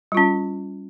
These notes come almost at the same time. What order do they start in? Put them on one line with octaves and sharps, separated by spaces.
G3 F4 C#4